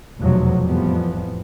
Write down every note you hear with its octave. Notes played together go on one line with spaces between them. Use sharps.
F1 E2 B2 F3 F#3
F2 A2 E3 F3 G3 B3